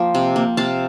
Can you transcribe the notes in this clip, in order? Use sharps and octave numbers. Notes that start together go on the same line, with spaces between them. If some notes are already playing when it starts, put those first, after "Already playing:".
Already playing: F3 A#3 C5 G5
C3
A#3
C3 F5 A5